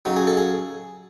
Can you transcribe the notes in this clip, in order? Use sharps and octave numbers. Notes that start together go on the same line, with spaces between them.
C#3 F#3 D#4
G#4
A4
G#4